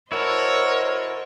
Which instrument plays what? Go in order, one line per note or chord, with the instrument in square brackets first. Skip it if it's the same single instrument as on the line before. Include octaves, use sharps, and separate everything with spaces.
[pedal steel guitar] E4 F#4 A4 [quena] A#4 [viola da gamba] C5 D#5 [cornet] C#5